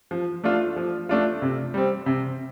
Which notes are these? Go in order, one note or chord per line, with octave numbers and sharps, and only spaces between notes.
F3
A3 D4 F4
F3
A3 D4 F4
C3
G3 C4
C3